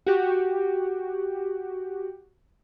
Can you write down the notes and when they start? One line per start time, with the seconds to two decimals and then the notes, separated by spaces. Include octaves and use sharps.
0.06 F#4 G4